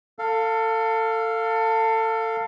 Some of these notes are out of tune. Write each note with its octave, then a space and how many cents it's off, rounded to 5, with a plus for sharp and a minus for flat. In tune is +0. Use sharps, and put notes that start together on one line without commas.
A4 +25 F5 +0